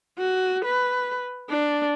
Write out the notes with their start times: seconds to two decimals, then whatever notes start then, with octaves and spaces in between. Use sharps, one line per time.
0.18 F#4
0.65 B4
1.50 D4